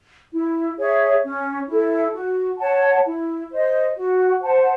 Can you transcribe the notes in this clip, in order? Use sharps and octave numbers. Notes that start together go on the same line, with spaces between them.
E4
G#4 C#5 E5
C#4
E4 A4
F#4
C#5 F#5 A5
E4
C5 D#5
F#4
C5 F#5 A5